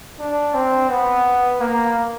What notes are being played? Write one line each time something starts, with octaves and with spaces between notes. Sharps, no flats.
D4
C4
B3
A#3